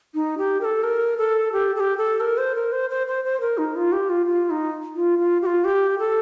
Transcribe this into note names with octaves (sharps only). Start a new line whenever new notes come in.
D#4
G4
A#4
A4
A#4
A4
G4
A4
G4
A4
A#4
C5
A#4
C5
C5
C5
C5
A#4
D#4
F4
G4
F4
F4
D#4
F4
F4
G4
F4
G4
A4